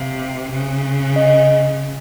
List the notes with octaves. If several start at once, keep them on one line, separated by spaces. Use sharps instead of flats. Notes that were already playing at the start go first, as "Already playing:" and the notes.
Already playing: C3 F5
C#3
D#5